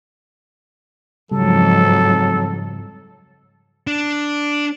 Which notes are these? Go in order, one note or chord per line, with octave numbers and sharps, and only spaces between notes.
F2 G#2 C#3 F#3 G3 A4
D4